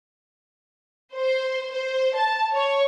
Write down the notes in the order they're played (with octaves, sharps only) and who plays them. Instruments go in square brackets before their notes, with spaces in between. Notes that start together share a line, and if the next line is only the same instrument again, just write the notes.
[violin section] C5
C5
A5
C#5